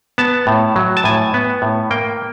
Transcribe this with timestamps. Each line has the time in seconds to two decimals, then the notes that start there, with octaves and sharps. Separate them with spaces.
0.18 B3 A5
0.47 A2
0.76 F#3
0.97 A5
1.04 A2 G#5
1.34 B3
1.62 A2
1.91 A#3 G5